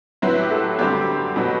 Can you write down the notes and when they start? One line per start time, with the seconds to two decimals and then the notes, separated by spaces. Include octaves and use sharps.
0.22 A2 F#3 C4 E4 B4
0.40 G4
0.51 A4
0.79 F#2 D3 G3 C4 G4
1.36 B2 F#3